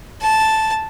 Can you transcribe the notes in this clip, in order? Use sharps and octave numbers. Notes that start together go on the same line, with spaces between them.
A5